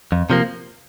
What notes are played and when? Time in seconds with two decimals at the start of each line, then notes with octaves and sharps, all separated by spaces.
0.12 F2
0.30 C3 F3 A#3